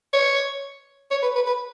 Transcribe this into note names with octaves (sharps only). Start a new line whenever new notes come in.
C#5
C#5
B4
B4
B4